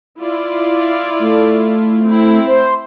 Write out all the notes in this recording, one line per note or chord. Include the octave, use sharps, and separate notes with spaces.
E4 F4 D5
A3
C4 E4
C5